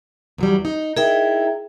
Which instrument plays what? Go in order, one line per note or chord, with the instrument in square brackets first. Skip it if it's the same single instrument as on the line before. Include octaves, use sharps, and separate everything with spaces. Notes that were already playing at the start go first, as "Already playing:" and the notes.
[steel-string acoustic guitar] E2 F#3 G3
D#4
[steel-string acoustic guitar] D#4 E4 A#4 [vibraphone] G#4 E5 G5